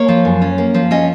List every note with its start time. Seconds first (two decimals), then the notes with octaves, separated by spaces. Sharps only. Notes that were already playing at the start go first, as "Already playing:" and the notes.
Already playing: A#3 C#5
0.08 F3
0.25 F#2
0.42 C#4
0.58 A#3
0.74 F3
0.91 C#4 D#5